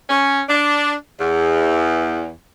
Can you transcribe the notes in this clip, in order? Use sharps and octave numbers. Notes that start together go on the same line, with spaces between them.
C#4
D4
E2